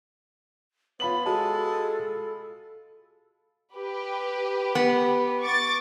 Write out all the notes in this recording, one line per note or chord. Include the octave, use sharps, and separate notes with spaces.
B3 F4 C#5 B5 F#7
G#3 F#4 A4 A5
G4 B4
B3
C#6 D6 A6